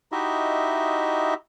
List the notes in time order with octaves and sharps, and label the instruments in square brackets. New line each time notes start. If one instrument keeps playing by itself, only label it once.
[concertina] D#4 E4 F#4 G4 D#5 E5